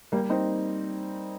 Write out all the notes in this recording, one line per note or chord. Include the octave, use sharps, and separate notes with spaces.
G3 A#3
C4 D#4